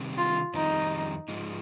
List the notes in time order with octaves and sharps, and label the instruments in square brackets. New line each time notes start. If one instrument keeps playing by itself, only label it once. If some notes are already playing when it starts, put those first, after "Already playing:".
Already playing: [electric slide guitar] C3 D#3 G3 C4
[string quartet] F4
[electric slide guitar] F2 D#3 G3 C4 [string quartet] D#4
[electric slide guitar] G#2 F3 G#3 D#4